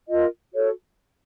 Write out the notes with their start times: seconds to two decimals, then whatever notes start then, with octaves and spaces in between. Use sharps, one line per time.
0.08 F4 A#4 D#5
0.52 F#4 A4 C#5